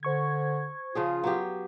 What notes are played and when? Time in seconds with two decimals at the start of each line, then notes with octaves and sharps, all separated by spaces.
0.03 D3 C5 C#6 G#6
0.95 C#3 F3 F4 G#4
1.24 F#3 B3 G4